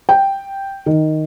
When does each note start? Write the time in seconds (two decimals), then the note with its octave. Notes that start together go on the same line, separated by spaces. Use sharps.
0.09 G5
0.86 D#3